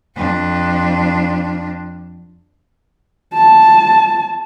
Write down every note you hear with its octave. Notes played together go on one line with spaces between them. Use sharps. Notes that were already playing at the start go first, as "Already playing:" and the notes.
F2 D4
A5